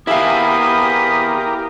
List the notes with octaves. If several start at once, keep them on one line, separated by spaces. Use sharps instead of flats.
E4 G4 G#4 A#4 E5 F5 B5 D#6